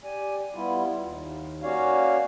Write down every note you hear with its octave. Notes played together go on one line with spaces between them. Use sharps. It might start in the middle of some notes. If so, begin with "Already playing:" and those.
G4 D5 G#5
G3 B3 E4 F4
D#2
A#3 C#4 F#4 C#5 D5 F5